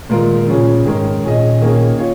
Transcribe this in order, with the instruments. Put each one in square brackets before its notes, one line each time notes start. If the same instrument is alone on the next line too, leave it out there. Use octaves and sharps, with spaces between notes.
[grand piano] A#2 G#3 F4 A#4 [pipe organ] D#3
[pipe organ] A#2 [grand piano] C#3 F3 C#4 G#4
[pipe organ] G#2 [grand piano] D#3 G#3 C#4 A#4
[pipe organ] A#2 [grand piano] C#4 G#4 D#5
[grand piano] D#3 A#3 C#4 G#4
F4 C#5